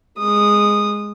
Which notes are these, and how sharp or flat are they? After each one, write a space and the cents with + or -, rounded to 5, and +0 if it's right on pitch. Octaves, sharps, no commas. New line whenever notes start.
G#3 -5 D#6 -15